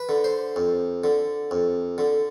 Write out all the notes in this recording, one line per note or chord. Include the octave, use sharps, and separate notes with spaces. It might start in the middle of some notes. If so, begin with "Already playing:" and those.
Already playing: B4
D3
C5
F2
D3
F2
D3